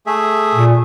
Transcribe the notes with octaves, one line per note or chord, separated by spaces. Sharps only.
A3 G#4 E5
A#2